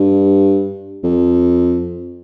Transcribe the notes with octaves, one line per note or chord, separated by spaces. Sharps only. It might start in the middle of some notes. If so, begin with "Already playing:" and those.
Already playing: G2
F2